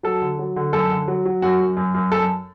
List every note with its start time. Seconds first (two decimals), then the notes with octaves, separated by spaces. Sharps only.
0.03 F#3 A4
0.22 D3
0.39 F#3
0.56 D3
0.73 F#2 A4
0.91 D3
1.08 F#3
1.25 F#3
1.42 F#2 F#4
1.60 F#2
1.77 F#2
1.94 F#2
2.12 F#2 A4